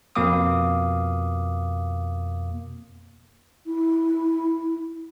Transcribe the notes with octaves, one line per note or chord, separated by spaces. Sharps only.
F2 B2 A#3 F5 D6 D#6
E4